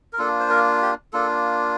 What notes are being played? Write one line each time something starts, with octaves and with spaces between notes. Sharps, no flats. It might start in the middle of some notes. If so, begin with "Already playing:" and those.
A#4
A#3 D4 F4 A4
C5
A#4
G4
A#3 D4 F4 A4